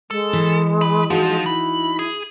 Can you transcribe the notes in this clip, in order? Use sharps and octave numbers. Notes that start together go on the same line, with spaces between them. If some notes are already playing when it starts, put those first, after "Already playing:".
G#3 A4
E3
A#4 B5
F3 D#4 F#4
E4 B5
G#4